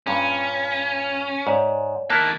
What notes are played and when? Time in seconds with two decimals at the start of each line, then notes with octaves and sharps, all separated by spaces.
0.07 G2 A#2 C#4
1.47 G#2 C#5 D5
2.10 D#3 A#3 E4 A5 F#6 A6